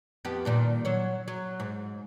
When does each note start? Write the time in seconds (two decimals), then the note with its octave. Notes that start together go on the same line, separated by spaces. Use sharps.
0.25 F2 B3 G4
0.45 G2 A#2 D#3
0.85 F#3 C#5
1.28 F#3
1.60 G#2